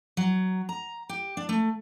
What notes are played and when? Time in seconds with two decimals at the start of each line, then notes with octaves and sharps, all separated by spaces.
0.17 F#3
0.69 A#5
1.09 G4
1.37 D4
1.49 A3